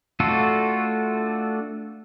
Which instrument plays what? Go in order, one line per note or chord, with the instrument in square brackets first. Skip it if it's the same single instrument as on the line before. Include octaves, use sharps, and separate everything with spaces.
[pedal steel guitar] A3 D4 F4 F#4 A4